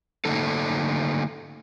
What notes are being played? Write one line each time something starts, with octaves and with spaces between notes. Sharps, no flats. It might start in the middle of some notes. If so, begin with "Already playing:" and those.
D3 A3 A#3 D#4 A4